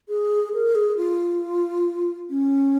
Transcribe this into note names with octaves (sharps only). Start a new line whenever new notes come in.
G#4
A#4
G#4
F4
C#4